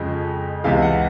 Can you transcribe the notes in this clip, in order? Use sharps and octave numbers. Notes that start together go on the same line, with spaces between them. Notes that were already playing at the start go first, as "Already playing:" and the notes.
Already playing: F2 C#3 F3 G#3
C#2 C3 E3 G#3 F5
F#5